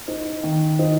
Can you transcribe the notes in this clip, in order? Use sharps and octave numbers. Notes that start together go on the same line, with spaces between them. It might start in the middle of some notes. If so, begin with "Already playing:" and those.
D#4
D#3
D#4